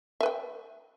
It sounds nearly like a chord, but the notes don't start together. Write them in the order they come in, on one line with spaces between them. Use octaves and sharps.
E5 B4 G5